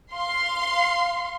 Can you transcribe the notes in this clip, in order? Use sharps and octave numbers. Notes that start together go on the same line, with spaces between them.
F5 C6